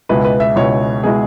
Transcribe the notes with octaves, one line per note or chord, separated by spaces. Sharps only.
C#2 B2 G#3 E4 B4
B4
E5
C#2 B2 G#3 E4 C#5
B2 G#3 E4 G#4